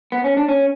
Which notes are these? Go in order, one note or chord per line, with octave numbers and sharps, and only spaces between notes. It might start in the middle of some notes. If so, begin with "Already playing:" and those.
B3
C#4
D4
C#4